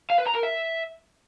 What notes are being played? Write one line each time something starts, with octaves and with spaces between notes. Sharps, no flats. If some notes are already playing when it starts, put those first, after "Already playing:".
F5
B4
A#5
A#4
E5